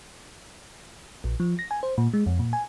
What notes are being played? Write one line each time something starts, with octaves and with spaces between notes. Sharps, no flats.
A#1
F3
A#6
G#5
C5
A#2
G#3
F2
A#2
G#5